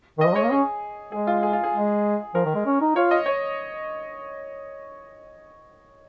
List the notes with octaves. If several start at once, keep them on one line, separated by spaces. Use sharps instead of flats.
D#3 D#5
F3
G#3 C#5
A#3
C#4 G#4
G#3 G#4
F4
G#4
F4
G#4
G#3
F3 A#4
D#3
G#3
C#4
D#4
F4 C#5
D#5
C#5